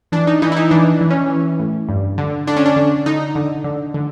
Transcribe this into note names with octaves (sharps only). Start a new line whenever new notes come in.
E3 D4
D#4
E3 D#4
E4
D#4
E3 D4
E3
C#4
E3
A2
G2
D3
D3 D4
C#4
D4
D3
D3 D#4
D3
D3
D3